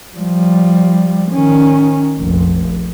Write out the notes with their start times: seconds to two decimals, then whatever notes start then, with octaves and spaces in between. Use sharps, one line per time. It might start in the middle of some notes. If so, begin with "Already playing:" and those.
0.17 F3 G3
1.32 D#3 C#4
2.18 F1 A#1